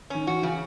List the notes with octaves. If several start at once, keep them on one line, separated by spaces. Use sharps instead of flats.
D#3 C#4
E3 F#4
C#3 E3